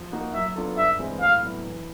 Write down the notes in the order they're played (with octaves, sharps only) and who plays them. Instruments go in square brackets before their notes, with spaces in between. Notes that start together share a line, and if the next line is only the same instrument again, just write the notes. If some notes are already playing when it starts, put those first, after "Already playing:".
Already playing: [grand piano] F3
A#3 D#4 F#4
[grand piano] F#3 [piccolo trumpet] E5
[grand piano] B3 D4 F4 A4
[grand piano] G2 [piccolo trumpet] E5
[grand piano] E3 G#3 C4 E4
[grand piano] A2 [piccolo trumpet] F5
[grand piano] F#3 B3 E4
E3